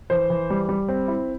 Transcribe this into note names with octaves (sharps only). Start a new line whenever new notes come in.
E3 C5
E3
G3
G3
C4
E4